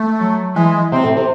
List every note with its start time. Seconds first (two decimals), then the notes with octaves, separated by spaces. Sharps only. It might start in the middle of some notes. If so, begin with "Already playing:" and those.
Already playing: A3
0.19 F#3
0.55 E3 G#3
0.92 C3 C4
1.04 A2
1.17 C3